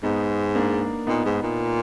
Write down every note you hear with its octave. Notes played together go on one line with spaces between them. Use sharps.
G#2 B3 D#4
A#3 D4
A#2 B3 D#4
G#2
A#2